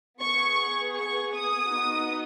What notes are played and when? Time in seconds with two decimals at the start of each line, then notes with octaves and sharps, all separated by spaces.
0.20 B3 G#4 C#6
0.95 C#6
1.33 D#6
1.70 B3 D#4 F#4